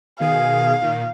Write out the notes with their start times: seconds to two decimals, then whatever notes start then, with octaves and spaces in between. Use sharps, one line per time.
0.20 B2 D#3 G#4 F5
0.82 A#2 D#3